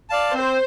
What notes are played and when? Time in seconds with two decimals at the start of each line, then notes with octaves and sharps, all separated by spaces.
0.10 D5 F5 A5
0.34 C4 C5